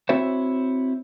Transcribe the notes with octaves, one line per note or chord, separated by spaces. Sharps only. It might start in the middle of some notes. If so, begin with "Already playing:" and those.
C4 E4 F#4 C5 C#5 E5